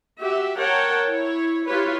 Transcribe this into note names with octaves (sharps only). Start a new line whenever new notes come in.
F#4 G4 E5
A#4 C#5 F#5 G5 A5 A#5
E4 C#5
E4 F4 G4 B4 C#5